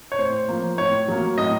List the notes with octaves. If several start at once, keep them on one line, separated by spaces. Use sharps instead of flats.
C#5
A2 C5
F3 A#3
A2 C#5
F#3 A#3
A2 D#5